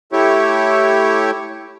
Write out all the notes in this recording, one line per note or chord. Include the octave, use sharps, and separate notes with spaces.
A3 E4 G4 C#5